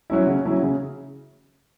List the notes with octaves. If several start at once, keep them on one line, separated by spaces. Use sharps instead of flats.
F#3 C#4 E4
C#3
F#3 C#4 E4
C#3